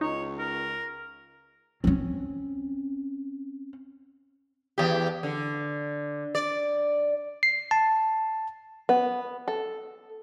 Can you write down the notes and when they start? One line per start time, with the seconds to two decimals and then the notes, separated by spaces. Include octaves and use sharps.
0.01 C#2 D#4 C#5
0.38 A#4
1.84 C4 C#4
4.78 E2 G4
5.23 D3
6.35 D5
7.43 C7
7.71 A5
8.89 B3
9.48 A4